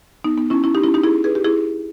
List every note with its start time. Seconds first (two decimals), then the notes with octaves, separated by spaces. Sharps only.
0.24 B3 D#4
0.37 B3 D#4
0.50 C#4 E4
0.64 C#4 E4
0.75 D#4 G4
0.84 C#4 E4
0.94 D#4 G4
1.04 E4 G#4
1.24 G#4 B4
1.35 G4
1.44 E4 G#4